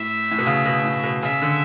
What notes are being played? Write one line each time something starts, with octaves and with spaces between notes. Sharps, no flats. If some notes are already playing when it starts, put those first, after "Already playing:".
Already playing: A2 E5
A2
B2
C#3
B2
A2
B2
C#3 E5
D3